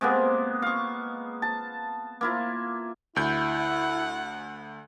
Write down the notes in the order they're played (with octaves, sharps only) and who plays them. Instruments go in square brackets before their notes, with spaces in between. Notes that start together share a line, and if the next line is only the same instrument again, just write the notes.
[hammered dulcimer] C3 G#3 A#3 B3
F5 C#6
A5
A#3 E4 F4
[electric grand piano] D2 G6 [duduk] E4 [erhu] F#5